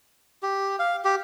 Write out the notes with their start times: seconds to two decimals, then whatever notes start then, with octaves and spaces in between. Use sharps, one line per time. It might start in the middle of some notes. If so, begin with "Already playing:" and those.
0.43 G4
0.79 F5
1.05 G4